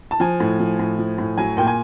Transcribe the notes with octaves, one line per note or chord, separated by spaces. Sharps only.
A5
F3 G#5
A2
F3
A2
F3
A2
F#3 G#5
A#2 G5
G#5